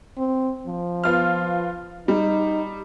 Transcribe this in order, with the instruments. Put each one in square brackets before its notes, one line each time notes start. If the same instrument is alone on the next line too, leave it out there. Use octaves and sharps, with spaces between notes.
[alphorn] C4
F3
[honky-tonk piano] B3 F4 F6
[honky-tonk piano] G3 [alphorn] D#4